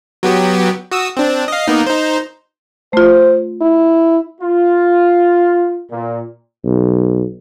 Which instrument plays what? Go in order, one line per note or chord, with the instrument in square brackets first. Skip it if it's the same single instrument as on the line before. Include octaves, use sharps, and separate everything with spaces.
[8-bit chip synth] F#3 B3 G4
F#4 D#6 E6
C4 D4
D#5 F5
A#3 B3 D#4
D#4 C5
[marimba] A3 F4 [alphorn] C5
[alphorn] E4
[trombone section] F4
A#2
[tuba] B1